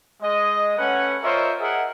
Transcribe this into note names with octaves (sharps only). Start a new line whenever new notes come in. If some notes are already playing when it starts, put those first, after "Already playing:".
G#3 D#5
A3 C#4 B4 F#5
F4 A#4 C5 C#5 D#5 E5
G#4 A#4 D#5 E5 F#5